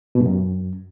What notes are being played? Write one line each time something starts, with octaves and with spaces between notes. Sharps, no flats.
B2
G2
F#2